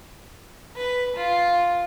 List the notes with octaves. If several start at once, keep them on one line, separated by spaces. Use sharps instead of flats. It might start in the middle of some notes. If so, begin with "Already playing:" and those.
B4
F4